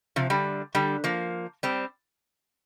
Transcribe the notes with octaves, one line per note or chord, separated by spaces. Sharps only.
C3 F3
D3 G3
D3 G3
F3 A#3
G3 C4